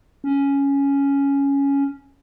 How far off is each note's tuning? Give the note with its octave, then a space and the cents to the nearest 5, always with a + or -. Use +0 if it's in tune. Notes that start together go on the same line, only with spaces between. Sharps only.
C#4 +5